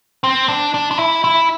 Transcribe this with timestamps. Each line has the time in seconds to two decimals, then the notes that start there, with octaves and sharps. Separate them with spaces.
0.24 C4
0.48 D4
0.74 D4
0.91 D4
0.99 E4
1.24 E4